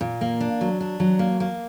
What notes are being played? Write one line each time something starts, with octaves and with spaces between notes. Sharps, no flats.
A#2
A#3
D4
F#3
D4
F#3
A#3
A#3